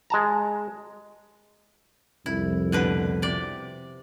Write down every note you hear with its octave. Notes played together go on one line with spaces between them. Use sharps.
G#3 A5 A#5
C2 F2 E4
B2 D3 B4
C3 D5